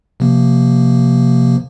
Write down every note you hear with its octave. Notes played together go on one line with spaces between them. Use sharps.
C3 F3 A#3